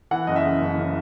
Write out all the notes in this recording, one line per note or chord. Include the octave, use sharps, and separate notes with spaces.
E3 F#5
F#1 D#5
E5
C#3
F#1
C#3